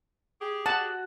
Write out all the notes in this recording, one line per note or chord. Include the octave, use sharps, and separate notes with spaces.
G4 G#4
F#4 A5